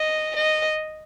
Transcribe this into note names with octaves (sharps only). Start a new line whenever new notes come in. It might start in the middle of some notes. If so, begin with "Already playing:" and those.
Already playing: D#5
D#5